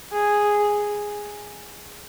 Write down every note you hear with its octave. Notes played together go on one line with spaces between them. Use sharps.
G#4